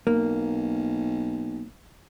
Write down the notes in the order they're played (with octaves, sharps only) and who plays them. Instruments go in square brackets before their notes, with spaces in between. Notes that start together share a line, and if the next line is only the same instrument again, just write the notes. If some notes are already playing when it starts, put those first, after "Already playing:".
[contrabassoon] B1 [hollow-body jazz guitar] A#3